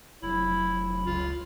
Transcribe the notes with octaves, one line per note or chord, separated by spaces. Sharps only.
F1 F#3 E4 B5
C#2 F4